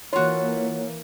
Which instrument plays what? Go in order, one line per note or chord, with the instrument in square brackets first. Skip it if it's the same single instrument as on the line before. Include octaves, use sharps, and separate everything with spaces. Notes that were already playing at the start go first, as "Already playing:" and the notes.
[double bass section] E3 A#3 [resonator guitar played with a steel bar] F4 F#4 [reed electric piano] C#5